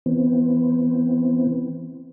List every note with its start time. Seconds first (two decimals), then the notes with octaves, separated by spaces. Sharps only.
0.06 E3 B3 C4